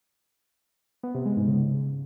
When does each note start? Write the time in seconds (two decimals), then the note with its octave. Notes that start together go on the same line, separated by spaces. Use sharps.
1.03 B3
1.15 C3
1.26 G#3
1.37 G#2
1.48 C#3